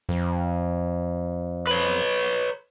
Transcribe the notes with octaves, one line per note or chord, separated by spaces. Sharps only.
F2
B4 C#5